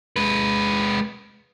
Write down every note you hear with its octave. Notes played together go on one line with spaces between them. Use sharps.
G#3 B4